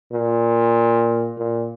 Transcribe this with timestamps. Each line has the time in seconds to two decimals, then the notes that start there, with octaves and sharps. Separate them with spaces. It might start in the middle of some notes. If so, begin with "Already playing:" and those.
0.13 A#2
1.38 A#2